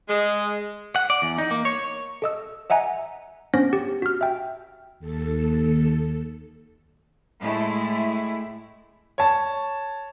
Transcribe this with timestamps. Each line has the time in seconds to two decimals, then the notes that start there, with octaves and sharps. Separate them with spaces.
0.09 G#3
0.96 F#5
1.10 D5
1.22 E2
1.38 D#4
1.51 A#3
1.65 C#5
2.22 A4 D#5 E6
2.70 D#5 E5 F#5 G#5 A#5
3.54 B3 C#4 D4 C5 A#6
3.73 G4
4.02 F#4 F6
4.21 E5 G5
4.99 D#2 A4
7.39 A2 G#3 A3 E4
9.18 C#5 A5